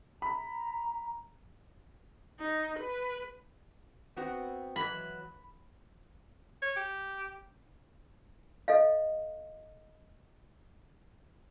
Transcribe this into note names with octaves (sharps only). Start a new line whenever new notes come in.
A#5 B5
D#4
B4
B3 C4 F#4
E3 F#3 B5
C#5
G4
A4 D#5 F5